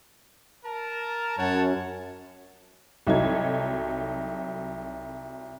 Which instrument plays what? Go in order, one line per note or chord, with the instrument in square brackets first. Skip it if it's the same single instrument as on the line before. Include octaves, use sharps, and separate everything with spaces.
[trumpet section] A#4 A5
[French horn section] F#2 [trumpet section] C#5 F#5 A5
[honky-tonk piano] C2 F#3 D#4 A4 G#6